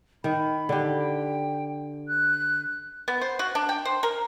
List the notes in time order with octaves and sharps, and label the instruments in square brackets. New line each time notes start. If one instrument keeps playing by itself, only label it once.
[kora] D#3 [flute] B5
[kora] D3 G4
[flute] G5
F#6
[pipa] B3
C5
F#4
D4
G5
C5
A#4